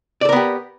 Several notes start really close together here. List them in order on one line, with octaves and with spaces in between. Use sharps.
D5 A4 A#4 B3 G4